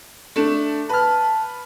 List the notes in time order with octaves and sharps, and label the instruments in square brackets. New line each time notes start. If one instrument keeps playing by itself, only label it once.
[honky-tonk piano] A3 D4 E7
[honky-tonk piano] B4 F6 [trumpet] A5